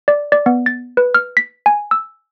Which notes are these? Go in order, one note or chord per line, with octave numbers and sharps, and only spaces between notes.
D5
D5
B3
A6
B4
F6
B6
G#5
E6